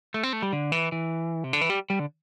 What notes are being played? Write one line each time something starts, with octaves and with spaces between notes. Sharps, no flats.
A3
C4
A3
G3
D3
E3
E3
C3
D3
E3
G3
G3
D3